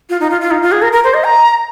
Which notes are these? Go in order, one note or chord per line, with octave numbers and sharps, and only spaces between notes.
F4
D#4
F4
F4
D#4
F4
G#4
A#4
A#4
C5
D#5
A#5